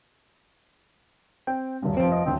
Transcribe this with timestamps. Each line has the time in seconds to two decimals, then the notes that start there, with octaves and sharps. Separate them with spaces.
1.47 C4 G5
1.82 D#1 D2 G2
1.97 F1 F3 C4 D7
2.12 D#5
2.26 D#1 D2 C4